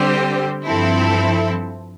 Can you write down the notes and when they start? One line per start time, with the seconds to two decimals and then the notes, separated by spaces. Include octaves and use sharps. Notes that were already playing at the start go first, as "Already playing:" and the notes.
Already playing: D3 G3 C4 G4 C5
0.66 G2 F3 C4 E4 A4